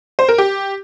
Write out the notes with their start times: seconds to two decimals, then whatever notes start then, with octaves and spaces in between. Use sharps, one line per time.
0.19 C5
0.29 A#4
0.38 G4